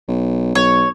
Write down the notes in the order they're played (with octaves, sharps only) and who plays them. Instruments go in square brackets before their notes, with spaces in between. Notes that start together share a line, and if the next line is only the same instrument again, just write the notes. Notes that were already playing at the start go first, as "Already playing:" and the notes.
[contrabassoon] B1
[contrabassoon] B1 [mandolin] C#5